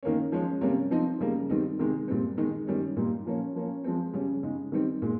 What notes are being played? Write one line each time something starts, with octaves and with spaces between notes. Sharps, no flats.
D#3 A#3 C#4
F3 G#3 C#4
C3 G3 A#3 C#4
F3 C4 D#4
C#3 G3 A#3
D#3 G3 C4 D#4
C3 D#3 G#3
A#2 G3 C4
D#3 G#3 D#4
D#3 G3 C#4
A#2 G3 A#3 D#4
F3 A#3 C#4
F3 A#3 C#4
F3 G#3 C4
C#3 G3 C#4
C#3 G#3 D#4
D#3 G3 C4 D#4
A#2 G#3